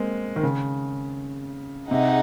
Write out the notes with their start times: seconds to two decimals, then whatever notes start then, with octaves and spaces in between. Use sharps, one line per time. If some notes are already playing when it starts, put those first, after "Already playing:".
Already playing: G#3 A#3 C4
0.36 D#3
0.43 C#3
1.91 C3 D#4 G#4 D#5 F#5